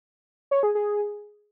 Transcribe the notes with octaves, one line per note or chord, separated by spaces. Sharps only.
C#5
G#4
G#4